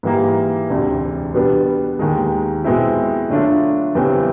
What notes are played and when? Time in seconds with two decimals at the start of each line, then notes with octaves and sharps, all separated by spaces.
0.03 G#2 E3 G3 A#3
0.69 E1 D2 C3
1.34 B2 G3 B3 D4
1.99 D#2 D#3 G#3
2.64 B2 G#3 C4 E4
3.29 D3 F#3 A3 D4 F4
3.95 E2 C#3 E3 G3 C4